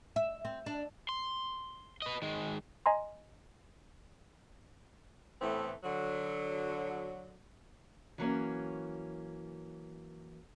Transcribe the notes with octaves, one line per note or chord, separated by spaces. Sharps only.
E5
C4
D4
C6
B4 D#5
D#3 G#3
D#5 G#5 A#5 C6
A2 E3 A3 B3 C4
D3 F#3
E3 F#3 A#3 C#4